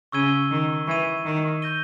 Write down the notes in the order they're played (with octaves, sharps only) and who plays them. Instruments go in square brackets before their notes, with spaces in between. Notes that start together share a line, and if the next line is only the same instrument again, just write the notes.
[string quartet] C#3 [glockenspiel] C#6 E6 G#6 D#7 G7
[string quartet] D#3
[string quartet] E3 [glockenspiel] C#6 G#6 D#7
[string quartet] D#3
[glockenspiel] G6 A#6 D#7 G7